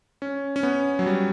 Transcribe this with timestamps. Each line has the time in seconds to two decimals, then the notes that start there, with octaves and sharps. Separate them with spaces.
0.22 C#4
0.56 C#4
0.63 B3
0.99 F#3
1.06 G3